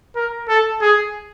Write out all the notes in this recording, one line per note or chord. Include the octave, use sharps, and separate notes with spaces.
A#4
A4
G#4